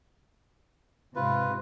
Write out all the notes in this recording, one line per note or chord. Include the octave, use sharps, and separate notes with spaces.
G#2 C3 F4 B4